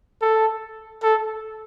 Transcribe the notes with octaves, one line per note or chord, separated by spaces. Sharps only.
A4
A4